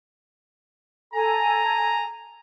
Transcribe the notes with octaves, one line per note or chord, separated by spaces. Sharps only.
A4 G#5 A#5